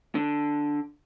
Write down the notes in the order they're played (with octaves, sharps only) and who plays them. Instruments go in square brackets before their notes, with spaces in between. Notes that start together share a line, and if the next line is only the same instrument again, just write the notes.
[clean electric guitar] D3